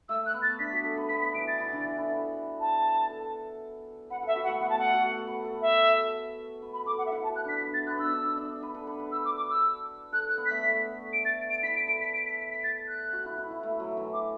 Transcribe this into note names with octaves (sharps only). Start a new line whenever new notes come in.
A3 E6
F#6
B3
A6
D4 B6
F#4
A4
B4
B3 B6
B6
E3 D7
A6
E3
D3
E3
E4
A4
A5
A4
B4 F#5
A4 E5
F#4
F#5
A3
B3 F#5
A5
A3 F#5
F#4
A4
B4
A4
E5
B4
B5
A4 D6
F#5
E5
E4 F#5
A5
F#4
F#6
D4 B6
B3
A6
B3 F#6
D4 E6
D4
D4
B4
A4
B4
B4
E6
D6
D6
E6
A4 F#6
F#6
B3
A3 B6
A3
D7
A6
D7
E4 B6
D7
A4 D7
B6
D7
B6
B6
B6
A6
F#6
F#4
E4
E4
E4
A3
F#3
E3
D6